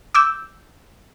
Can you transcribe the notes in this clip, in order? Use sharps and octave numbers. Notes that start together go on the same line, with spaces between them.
D6 E6 G6